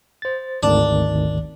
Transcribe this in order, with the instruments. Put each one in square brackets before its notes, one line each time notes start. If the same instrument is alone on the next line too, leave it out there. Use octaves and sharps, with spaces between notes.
[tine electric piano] C5 A6
[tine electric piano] G#1 D2 D#3 [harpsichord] D4